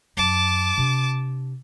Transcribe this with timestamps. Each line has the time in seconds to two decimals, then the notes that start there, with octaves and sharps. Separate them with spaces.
0.17 F#2 A5 D6
0.77 C3 D4